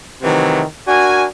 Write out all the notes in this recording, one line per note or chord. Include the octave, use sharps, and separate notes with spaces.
C3 D#3 E3 F#3 A3
D4 F#4 A#4 G#5